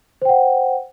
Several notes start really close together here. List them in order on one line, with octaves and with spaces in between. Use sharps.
C5 G5 F#5